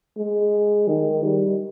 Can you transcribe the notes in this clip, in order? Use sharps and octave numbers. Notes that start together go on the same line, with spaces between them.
G#3
D#3
G3